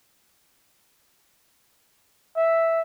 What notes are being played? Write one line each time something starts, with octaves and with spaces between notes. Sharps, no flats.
E5